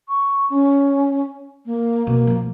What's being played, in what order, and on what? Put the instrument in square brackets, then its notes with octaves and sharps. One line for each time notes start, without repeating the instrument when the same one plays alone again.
[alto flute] C#6
C#4
A#3
[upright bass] B2 [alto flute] A#3
[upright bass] F3 A3